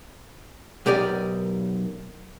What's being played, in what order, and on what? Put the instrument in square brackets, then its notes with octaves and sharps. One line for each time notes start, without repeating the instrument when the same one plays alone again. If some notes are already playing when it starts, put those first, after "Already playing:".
[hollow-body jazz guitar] B1 G4 A#4 D5 D#5